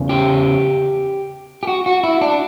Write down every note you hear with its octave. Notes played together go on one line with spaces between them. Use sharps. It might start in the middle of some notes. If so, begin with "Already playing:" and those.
Already playing: E2 C#3
G4
G4
F#4
F#4
E4
D4